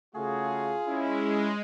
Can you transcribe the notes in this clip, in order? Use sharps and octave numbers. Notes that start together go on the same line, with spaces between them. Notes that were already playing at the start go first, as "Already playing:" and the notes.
C#3 A3 F4 F#4 G#4
G#3 C#4 E4